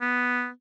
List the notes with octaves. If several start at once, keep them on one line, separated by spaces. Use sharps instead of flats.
B3